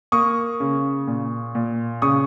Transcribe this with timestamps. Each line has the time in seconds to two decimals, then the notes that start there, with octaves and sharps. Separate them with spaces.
0.12 A#3 C#6 D#6
0.60 C#3
1.07 A#2
1.55 A#2
2.02 C#3 C#6 D#6